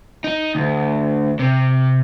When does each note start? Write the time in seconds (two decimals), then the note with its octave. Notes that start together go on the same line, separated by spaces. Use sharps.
0.24 D#4
0.55 D2
1.39 C3